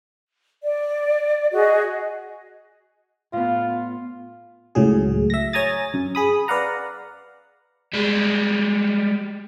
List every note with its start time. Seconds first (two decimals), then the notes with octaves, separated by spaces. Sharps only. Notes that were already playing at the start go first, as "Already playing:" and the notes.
0.62 D5
1.53 F#4 G#4 D#5
3.33 A2 B3 F4 F5
4.75 C#2 A2 F#3 G#4
5.30 E5 A#6
5.53 C#5 G#5 A#5 D#6 A6
5.94 F#2
6.15 G#4 B5 D#6
6.48 B4 D5 F5 F#5 A#5
7.94 G3 G#3